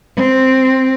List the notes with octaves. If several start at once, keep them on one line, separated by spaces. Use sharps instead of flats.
C4